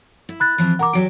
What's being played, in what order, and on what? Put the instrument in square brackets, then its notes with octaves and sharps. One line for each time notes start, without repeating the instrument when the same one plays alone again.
[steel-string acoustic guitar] E4
[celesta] B5 F#6 A6
[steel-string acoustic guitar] E3 F3 C4
[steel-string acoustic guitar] A#4 [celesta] F#5 A#5 D6
[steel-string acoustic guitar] E2 F#3 G4 [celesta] D7